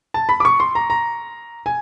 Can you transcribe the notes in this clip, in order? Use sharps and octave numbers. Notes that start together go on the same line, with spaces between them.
A5
B5
D6
C#6
C6
A#5
A#5
G#5